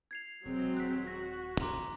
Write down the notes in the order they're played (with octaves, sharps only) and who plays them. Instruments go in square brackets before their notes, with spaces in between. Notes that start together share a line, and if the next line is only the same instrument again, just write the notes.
[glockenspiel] G#6 C7 F7
[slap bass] E1 C3 [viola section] F#3 G#3 C4
[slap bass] D#1 [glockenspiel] F#6 B6
[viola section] F#4 [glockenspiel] A#6
[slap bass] C2 F2 F3 [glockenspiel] A#5 C6 D6